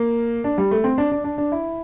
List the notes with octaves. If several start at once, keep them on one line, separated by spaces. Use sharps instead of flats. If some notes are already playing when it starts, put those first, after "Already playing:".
Already playing: A#3
D4
G3
A3
C4
D4
D4
D4
D4
E4